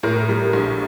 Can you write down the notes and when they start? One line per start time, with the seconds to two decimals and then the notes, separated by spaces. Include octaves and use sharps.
0.03 A2 A#4
0.29 G3
0.53 A#1